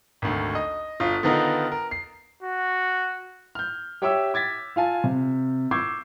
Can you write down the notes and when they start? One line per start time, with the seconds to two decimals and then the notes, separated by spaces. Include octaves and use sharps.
0.22 G#1 D2
0.55 D#5
1.00 G1 F4 D#6
1.23 D3 D#3 B3 D#4 F4 A#4
1.72 A#4
1.91 C7
2.43 F#4
3.55 F6 G6
4.02 G4 C#5 E5 G5 D6 E6
4.34 D6 G#6 A6 B6
4.76 F4 F5 G#5 A5
5.04 C3
5.71 C#6 D6 E6 G6 G#6 C7